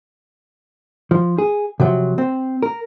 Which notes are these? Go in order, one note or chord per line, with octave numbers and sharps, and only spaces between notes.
F3
G#4
C3 F3 F#3
C4
A#4